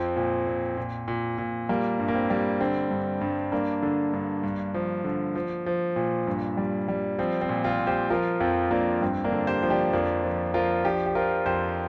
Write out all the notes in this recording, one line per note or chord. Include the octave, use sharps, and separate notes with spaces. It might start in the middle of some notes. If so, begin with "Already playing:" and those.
Already playing: F2 F3 C4
A#2
A#2
A#2
A#2
A#2
G3 A#3
G2
A#3
C4
G3
D3 C4
G2
G2
G2 A#3 D4
D3
G2
G2
F3
D3
F3
F3
A#2
G2
G3
G3
F3 C4
C4
A#2
C4 F4
A#2
G4 C5
F3 F4 A#4
F2 C4 F4
F2 A#3 D4
G2 C4
A#3 D4
D3
G4 C5
F3
D4 G4
F2 A#3 D4
F3
F3 F4 A#4
F3 D4 G4
G4
F3 F4 A#4
F2 G4 C5